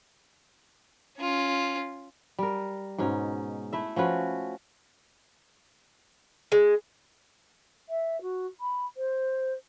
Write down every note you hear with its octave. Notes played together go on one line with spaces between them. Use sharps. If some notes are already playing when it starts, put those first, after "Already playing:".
C#4 F4
G3 A#4
G#2 B2 C#4 D#4
A3 E4 E5
F3 C#4 F#4 B4
G#3
E5
F#4
B5
C5